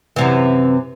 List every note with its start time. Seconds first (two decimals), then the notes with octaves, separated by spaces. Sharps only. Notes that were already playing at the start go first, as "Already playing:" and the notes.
0.16 F#2 C3 E3